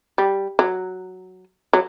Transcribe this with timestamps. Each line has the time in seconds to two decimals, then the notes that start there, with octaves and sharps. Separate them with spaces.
0.18 G3
0.59 F#3
1.73 F#3